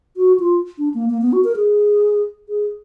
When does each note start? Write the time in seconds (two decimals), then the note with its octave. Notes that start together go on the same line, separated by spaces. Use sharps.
0.17 F#4
0.40 F4
0.78 D4
0.94 A#3
1.10 A#3
1.21 B3
1.33 F#4
1.44 A#4
1.56 G#4
2.49 G#4